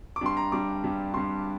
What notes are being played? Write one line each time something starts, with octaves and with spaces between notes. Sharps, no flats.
D6
G2 G3 D4 C6
A#5
G2 G3 D4 D6
G2 G3 D4
G2 G3 D4 C6